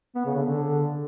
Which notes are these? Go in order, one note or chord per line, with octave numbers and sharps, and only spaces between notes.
B3
C#3
D3
D3